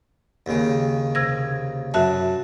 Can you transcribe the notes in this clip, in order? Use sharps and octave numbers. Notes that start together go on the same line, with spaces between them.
D#2 C#3
C3 G#6 A#6
F#2 F#4 E5 A5